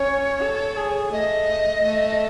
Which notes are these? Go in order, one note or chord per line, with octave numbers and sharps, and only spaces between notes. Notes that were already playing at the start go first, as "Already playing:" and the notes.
Already playing: C#4 C#5
A4
G#4
A3 D#5
A3